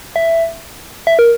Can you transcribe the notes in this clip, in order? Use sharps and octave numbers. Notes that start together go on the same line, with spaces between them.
E5
E5
A#4